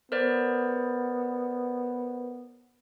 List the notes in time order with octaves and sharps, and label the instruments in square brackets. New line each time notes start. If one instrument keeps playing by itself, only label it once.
[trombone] B3 [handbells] A#4 C5 D5